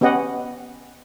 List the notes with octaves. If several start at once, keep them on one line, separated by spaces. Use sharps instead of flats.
B3 C#4 G4 D#5 F#5